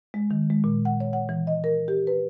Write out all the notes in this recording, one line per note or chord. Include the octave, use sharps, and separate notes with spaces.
G#3
D#3
G#3
A#2
F#5
C#5
F#5
E3
D#5
A#4
G4
B4